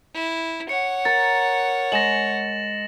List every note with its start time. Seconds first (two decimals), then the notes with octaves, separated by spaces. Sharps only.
0.15 E4
0.69 C#5 F#5 C#7
1.05 A#4 A6
1.92 G#3 A#6 E7 F#7